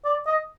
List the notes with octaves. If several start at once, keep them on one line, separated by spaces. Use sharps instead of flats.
D5
D#5